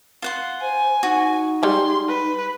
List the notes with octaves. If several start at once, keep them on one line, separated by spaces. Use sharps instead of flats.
F4 F#5 C6
C5 G#5
D#4 F#4
G3 G#3 C6
B4